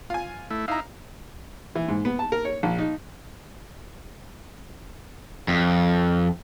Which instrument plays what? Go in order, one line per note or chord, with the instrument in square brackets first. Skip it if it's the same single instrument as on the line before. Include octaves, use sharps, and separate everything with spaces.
[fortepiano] F4 G#5
[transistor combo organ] A3 E4
[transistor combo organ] D#4 E4 [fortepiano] F5 A#5
[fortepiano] E3
G#2
B3
A5
A#4
C#5
A#1
D#4
[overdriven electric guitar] F2